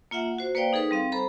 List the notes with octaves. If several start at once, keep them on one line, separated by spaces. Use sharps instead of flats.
A#3 F4 E5 F#5
F#4 C5
A#3 B4 C5 D5 F5 G5
D#4 G#4 A4 B4
G3 C4 F5
A4 C5 A#5 B5